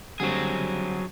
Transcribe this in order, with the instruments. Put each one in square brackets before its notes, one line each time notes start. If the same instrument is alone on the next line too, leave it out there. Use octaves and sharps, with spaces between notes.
[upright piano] D3 G3 C4 [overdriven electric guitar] F#3 G#4